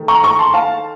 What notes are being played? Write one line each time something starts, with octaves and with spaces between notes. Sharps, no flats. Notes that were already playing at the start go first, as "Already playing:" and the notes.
Already playing: D#3 A3
A#5 C#6
A#5 C#6
A5 C6
F5 A5